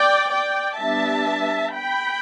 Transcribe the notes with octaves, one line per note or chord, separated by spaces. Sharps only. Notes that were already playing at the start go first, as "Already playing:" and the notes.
Already playing: D5 G5
D5 G5
G3 B3 D4 E5 A5
G5 B5